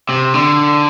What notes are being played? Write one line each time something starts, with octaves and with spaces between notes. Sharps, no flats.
C3
D3